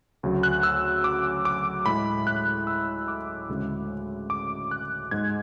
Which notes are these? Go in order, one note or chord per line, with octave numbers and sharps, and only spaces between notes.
D2 C#3 F#3
F#6
E6
D6
D6
A2 G#3 B5
F#6
E6
D6
D2 C#3 G#3
D6
F#6
G#2 G#3 G#6